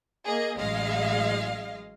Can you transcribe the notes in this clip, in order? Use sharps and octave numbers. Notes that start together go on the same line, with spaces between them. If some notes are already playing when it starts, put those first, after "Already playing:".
A#3 G#4 D#5
A1 F#3 G#3 D#5 F5